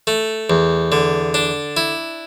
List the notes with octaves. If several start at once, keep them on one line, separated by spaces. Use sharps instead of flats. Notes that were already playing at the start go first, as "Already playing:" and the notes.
A3
E2
D3
D4
E4